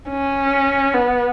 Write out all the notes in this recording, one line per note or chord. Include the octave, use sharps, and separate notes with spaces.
C#4
B3